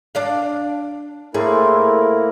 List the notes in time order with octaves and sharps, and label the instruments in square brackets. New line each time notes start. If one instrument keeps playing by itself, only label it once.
[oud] D4 D5 F5
[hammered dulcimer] A2 A3 C5 [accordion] A#3 E4 A#4 [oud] G#4